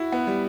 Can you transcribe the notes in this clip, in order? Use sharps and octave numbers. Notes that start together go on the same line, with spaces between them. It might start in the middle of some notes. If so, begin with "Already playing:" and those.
Already playing: E4 F#4
B3
G3